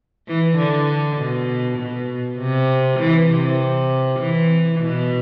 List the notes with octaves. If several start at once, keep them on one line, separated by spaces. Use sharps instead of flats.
E3
D3
B2
B2
C3
E3
C3
E3
B2